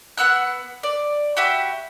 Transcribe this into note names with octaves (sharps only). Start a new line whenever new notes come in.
B3 F#5 E6 F#6
D5
F#4 G4 E5 B5